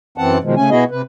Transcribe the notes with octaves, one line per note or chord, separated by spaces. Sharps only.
F#2 E3 C4 F#5 A5
B2 D#3 F3 G#3
C#3 A3 C#4 G#5
B2 B3 E4 F#4 G#4 D#5
C3 B4